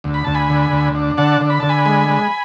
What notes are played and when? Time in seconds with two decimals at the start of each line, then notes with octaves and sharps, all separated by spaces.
0.04 D2
0.14 B5
0.24 D2 A5
0.34 G#5 B5
0.49 D3
0.72 D2
0.95 D4
1.18 D3 F#5 A5
1.41 D3
1.50 B5
1.60 D3 A5
1.69 G#5 B5
1.86 G#3
2.08 G#3